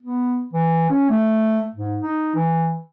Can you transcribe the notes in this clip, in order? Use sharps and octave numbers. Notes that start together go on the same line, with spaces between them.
B3
E3
C#4
A3
G#2
D#4
E3